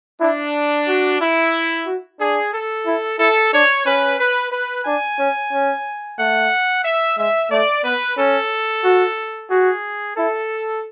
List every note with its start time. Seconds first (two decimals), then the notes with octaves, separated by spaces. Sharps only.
0.20 D4 E4
0.87 F#4
1.21 E4
1.86 F#4
2.20 D4 G#4
2.54 A4
2.86 E4
3.19 E4 A4
3.53 D4 C#5
3.86 C#4 B4
4.19 B4
4.52 B4
4.85 D4 G#5
5.19 C#4
5.52 C#4
6.18 A3 F#5
6.85 E5
7.18 G#3 E5
7.51 A3 D5
7.84 B3 B4
8.17 C#4 A4
8.84 F#4
9.50 F#4 G#4
10.16 E4 A4